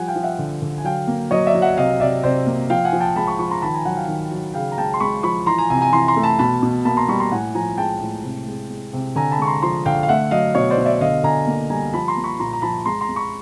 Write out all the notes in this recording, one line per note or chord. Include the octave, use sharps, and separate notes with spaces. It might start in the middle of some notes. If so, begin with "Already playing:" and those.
Already playing: F3 G3 F#5 G#5
F5 G5
F3
E5 F#5
D3
D3
G#5
F#3 F5 G5
A#3
F#3 C#5 D#5
D5 E5
F#3
E5 F#5
C3 D#5 F5
C3 D5 E5
C3 C5 D5
A#3
F3 F5 G5
F#5 G#5
F3
G5 A5
G#3 A5 B5
B5 C#6
F3 B5 C#6
A#5 C6
D#3 A5 B5
G#5 A#5
F#3 F#5 G#5
F5 G5
D#3
F#3
C#3 F5 G5
A#5
G#3 G5 A5
C6
G#3 B5 C#6
F3 B5 C#6
E3 A#5 C6
G#5 A#5
C3 G#5 A#5
G#5 A#5
E3 A#5 C6
A#5 C6
A3
A5 B5
B2 A5 B5
B2
A#3 A5 B5
A#5 C6
G3 B5 C#6
A#5 C6
A2 F#5 G#5
F3 G#5 A#5
G#3 G5 A5
A2
C3
G#3
G#3
C3
D3 G#5 A#5
A5 B5
G#3 C#6
A#5 C6
F3 A#5 C6
D3 F5 G5
F5
A3 E5 F#5
F#3 D#5 F5
B2 C#5 D#5
C5 D5
B2
D5 E5
D3 D#5 F5
D3 G#5 A#5
A#3
G3 G#5 A#5
F3 A5 B5
A#5 C6
A#3
B5 C#6
A#2 A#5 C6
A#5
F3 A5 B5
G#3 A#5 C6
A#5 C6
G#3
B5 C#6